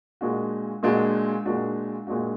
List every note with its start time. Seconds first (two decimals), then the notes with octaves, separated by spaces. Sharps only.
0.21 A#2 G#3 D4 F#4
0.83 A#2 G#3 D4 F#4
1.45 A#2 G#3 D4 F#4
2.07 A#2 G#3 D4 F#4